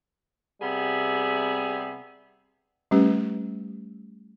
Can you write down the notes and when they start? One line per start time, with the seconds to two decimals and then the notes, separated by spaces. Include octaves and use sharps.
0.61 C3 G3 B3 G#4 E5
2.91 G3 A3 C#4 G4 B4